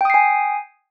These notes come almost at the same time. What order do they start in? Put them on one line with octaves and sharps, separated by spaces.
G5 D#6 C7 G#5